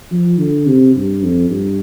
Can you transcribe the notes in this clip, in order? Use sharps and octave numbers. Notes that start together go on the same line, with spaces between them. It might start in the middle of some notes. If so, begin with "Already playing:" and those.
F3
D3
C3
G2
F2
G2